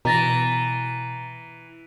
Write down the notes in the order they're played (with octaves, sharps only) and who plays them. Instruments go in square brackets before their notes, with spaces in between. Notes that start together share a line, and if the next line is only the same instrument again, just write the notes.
[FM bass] B2 [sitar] E3 [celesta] A#5 A6 A#6